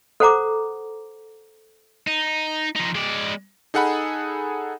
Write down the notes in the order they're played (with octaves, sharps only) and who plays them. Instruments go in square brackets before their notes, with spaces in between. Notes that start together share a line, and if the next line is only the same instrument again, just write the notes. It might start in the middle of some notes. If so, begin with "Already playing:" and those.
[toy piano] A4 C5 F#5 A#5 D6
[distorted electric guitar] D#4
F3 D#4
G#3 D5
[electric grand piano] D#4 G#4 A4 F#5 G#5 B5